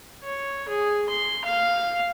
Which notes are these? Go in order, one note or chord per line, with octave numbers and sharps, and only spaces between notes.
C#5
G#4
C6
F5